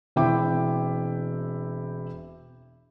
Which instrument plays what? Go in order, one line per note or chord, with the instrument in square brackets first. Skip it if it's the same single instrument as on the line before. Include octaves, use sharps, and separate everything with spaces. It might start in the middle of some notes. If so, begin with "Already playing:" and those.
[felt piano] E1 C4 E4 E5 G5 D6